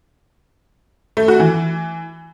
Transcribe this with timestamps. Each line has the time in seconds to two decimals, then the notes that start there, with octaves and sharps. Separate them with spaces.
1.17 A3
1.28 F#4
1.40 E3